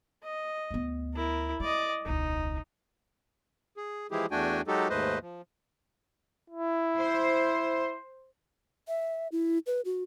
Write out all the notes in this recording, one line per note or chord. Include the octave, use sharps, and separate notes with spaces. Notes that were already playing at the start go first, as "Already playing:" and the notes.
D#5
D2 B3
E4 A#4
G#3 D5 D#5
E1 C#2 D#4
G#4
E3 F3 G#3 E4 G4 G#4
E2 A3 D4 F#4 G5 G#5
F#3 G#3 D#4 F#4 G4 A4
D#2 G#2 A3 B4 C5 D#5
F3
E4
C5
E5
E4
B4
F#4